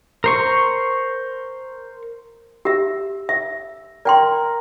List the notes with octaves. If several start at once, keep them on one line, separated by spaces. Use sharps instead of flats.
A#4 C5 C#6
G4 E5 E6
E5
A#4 D5 G5 C6